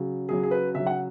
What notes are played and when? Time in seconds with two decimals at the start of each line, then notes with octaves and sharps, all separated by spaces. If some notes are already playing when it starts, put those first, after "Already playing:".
Already playing: C#3 F#3
0.29 C#3 F#3 G#4
0.43 G#4
0.51 B4
0.75 C#3 F#3 E5
0.87 F#5